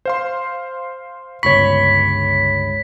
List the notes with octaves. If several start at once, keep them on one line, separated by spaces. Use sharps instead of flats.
C5 F5 C6
G1 C#2 C#5 B5 C#6 B6